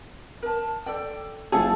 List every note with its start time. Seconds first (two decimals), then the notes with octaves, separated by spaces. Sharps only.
0.43 A#4 A5
0.86 A4 D5 G5
1.52 F#1 F4 G#4 A4 A5